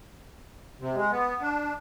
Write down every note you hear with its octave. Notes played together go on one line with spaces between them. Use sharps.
C3
G#3
B3
D4